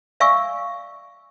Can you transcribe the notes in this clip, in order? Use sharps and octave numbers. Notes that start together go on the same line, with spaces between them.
D5 E5 F5 G#5 C#6 E6